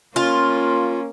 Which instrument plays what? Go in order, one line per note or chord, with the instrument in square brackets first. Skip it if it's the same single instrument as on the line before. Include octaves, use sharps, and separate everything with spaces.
[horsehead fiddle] A#3 C#4 [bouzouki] F4